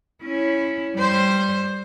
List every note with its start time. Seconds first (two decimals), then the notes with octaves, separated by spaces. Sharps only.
0.23 C#4 E4
0.95 G3 C5